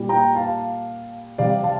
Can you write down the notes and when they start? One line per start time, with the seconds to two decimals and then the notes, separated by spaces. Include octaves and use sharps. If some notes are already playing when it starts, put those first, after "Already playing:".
Already playing: A#2 G3
0.09 G5 A#5
0.35 F5 A5
1.38 C3 G3 D5 F5
1.63 F5 A5